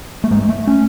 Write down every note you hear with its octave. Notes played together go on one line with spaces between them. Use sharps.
A3
G#2 G#3
G#3
A3
C#4